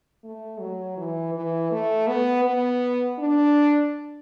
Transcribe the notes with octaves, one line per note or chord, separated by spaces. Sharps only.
A3
F#3
E3
E3
A3
B3
B3
D4